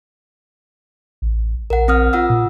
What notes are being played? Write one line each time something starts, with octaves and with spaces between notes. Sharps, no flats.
A1
A#1 A#4 F#5
C4 D#6 F6
F4 F#5 E6
A#2